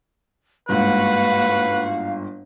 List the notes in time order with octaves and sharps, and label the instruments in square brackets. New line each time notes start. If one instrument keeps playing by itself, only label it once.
[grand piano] G1 G#2 [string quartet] A#3 F#4 F#5 [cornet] B4 [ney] F5